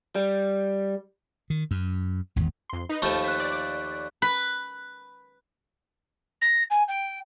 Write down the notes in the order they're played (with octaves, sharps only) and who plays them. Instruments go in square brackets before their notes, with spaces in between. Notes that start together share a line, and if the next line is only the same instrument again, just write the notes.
[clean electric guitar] G3
[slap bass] D#3
F#2
G#1 E2 A2
[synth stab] F2 C6
D#4 B4
[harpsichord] D#2 F3 A3 [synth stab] A5 [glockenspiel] C#6
[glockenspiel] F#6 B6
[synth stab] D5
[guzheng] B4
[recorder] A#6
G#5
G5